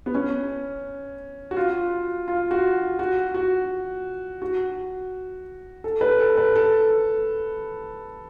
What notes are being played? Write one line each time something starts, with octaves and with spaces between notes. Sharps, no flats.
B3
C#4
F#4
F4
F4
F#4
F#4
F#4
F#4
A4
B4
A4
B4
A4